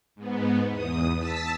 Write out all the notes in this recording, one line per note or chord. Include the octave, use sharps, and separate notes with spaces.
G#2 B3
E2 D#6
A5 E6 A6 B6